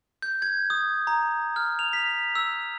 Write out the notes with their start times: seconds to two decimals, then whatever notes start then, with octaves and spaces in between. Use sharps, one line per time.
0.22 G6
0.42 G#6
0.70 D#6
1.07 A#5
1.56 F6
1.79 F7
1.93 B6
2.35 E6